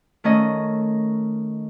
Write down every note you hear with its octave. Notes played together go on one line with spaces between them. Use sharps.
D#3 A3 C#4 D#5